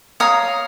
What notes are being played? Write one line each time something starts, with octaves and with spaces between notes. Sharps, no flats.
C#5 F5 A#5 D#6